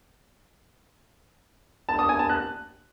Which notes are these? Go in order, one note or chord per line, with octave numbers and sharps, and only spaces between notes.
A5
D#6
G#5
A5
F#6